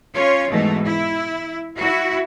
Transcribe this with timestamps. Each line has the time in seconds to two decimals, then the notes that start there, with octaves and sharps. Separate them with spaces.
0.14 C#4 F4 C#5
0.51 G#2 B2 E3 A3
0.85 E4
1.77 E4 F#4